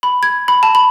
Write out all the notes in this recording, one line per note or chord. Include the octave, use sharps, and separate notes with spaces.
B5
G#6
B5
A5
B5